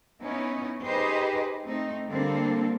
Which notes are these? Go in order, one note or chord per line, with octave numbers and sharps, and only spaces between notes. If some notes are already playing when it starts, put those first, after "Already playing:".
B3 C#4 D#4 E4
D#4 G4 G#4 B4 C5 D#5
A3 C4 D#4
D3 G3 A#3 C4 D4 A4